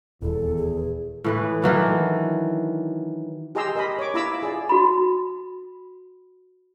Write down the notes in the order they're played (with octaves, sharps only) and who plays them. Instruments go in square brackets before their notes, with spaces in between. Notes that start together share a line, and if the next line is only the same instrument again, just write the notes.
[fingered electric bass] D#1 [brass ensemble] E2 [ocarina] A4
[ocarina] G#4
[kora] A2 E3 B4
D#3 E3 F#3 D4
[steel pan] G4 G#4 D#5 A#5 C6 E6
A#4 D#5 B5
C#5 D6
E4 F4 A#5 B5 D6 E6
G#4 D5
[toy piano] F#4 B5